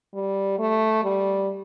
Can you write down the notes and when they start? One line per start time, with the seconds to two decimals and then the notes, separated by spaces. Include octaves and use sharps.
0.14 G3
0.59 A3
1.03 G3